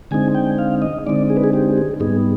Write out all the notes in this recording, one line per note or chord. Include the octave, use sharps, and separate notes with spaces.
D3 G#3 C4 D#4 G#5
G5
F5
D#5
D3 G#3 C4 D#4 D5
G#4
B4
G#4
G4
G#4
G#2 G3 B3 D#4 G#4